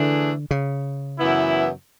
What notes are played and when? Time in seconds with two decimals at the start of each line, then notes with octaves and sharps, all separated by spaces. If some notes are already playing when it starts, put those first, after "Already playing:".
Already playing: D3 E3 A3 D4 G#4
0.51 C#3
1.19 F#2 E3 B3 E4